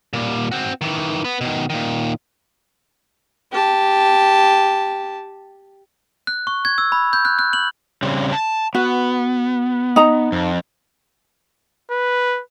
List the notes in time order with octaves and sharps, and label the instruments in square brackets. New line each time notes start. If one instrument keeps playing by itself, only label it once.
[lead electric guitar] A#2 G3
C4 F#4
D#3 E3
B3 B4
B2 D#3
A#2 D#3
[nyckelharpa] G4 A5
[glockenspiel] F#6
C#6
G#6
E6
B5
G6
F#6
F#6
F#7
[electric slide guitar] C#3 G3 C4
A5
[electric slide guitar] B3 [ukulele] F#4
[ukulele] D#4 A#5
[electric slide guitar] F2
[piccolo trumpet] B4